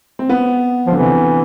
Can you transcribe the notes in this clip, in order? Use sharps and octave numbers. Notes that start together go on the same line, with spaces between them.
C4
B3
F3
D3
C3 E3